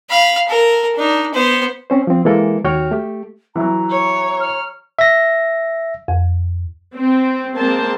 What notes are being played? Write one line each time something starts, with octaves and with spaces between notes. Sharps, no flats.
F5 B5
A4 A#4
D4 D#4
B3 C5
C4 C#4 C5
F3 C4
E3 G#3 A#3 A4 A#4
D#2 F#4 C#5 G5 F6
A3 G4
E3 F#3 A#5
C#5
F6
E5 A#6
F2
C4
G#3 A#3 C4 C5 A5